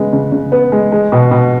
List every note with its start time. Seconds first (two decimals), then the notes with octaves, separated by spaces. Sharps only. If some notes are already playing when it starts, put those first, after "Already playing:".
Already playing: C#3 G#3 B3
0.13 C#3
0.32 C#3
0.52 B3
0.72 G#3
0.92 G#3
1.12 B2
1.31 B2